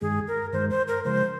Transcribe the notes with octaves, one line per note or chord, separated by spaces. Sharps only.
G2 D#3 G#3 G#4
A#4
G2 D#3 G#3 C5
C5
A#4
C#3 F3 G#3 C5